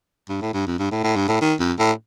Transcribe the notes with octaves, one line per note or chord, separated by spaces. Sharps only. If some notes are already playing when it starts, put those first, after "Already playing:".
G2
A2
G2
F2
G2
A2
A2
G2
A2
D#3
F2
A2